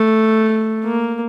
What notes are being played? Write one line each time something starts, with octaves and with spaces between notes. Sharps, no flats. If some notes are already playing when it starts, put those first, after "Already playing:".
Already playing: A3
A#3